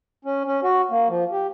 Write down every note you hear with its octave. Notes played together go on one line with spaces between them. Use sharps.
C#4
C#4
F#4
A#3
F3
G4